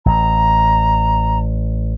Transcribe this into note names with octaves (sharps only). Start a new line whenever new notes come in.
A1 A#5